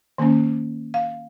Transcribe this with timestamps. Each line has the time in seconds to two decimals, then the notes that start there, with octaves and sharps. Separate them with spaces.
0.18 D#3 A#3 C#4
0.94 F5